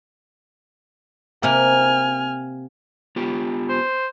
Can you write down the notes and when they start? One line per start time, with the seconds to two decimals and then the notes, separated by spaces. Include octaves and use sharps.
1.43 C3 A#3 G#5 F6
3.16 B3 F4 G4
3.69 C5